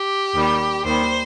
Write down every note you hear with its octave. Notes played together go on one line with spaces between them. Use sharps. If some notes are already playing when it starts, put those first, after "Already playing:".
Already playing: G4
D#2 D#3 G3
D#2 D#3 G3 C5